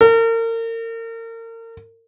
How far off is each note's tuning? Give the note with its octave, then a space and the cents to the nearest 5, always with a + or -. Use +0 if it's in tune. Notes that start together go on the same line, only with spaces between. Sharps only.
A#4 -35